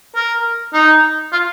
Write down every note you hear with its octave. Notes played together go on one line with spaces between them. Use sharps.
A#4
D#4
F4